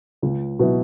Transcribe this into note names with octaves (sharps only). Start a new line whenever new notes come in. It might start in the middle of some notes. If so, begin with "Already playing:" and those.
C#2
B2 F#3 B3 E4